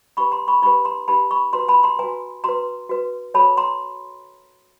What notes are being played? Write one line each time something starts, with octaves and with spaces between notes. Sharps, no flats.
D#4 G4 B4 B5 C#6
A#5 C6
B5 C#6
D#4 G4 B4 B5 C#6
A#5 C6
D#4 G4 B4 A5 B5
B5 C#6
F#4 B4 A#5 C6
A5 B5
A#5 C6
F#4 B4 G#5 A#5
F#4 B4 A#5 C6
F#4 B4
F#4 A4 C#5 A5 B5
A#5 C6